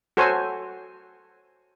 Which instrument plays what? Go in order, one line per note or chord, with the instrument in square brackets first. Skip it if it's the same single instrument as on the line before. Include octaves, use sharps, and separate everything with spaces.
[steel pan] F#4 A4 C5 C#5 G#5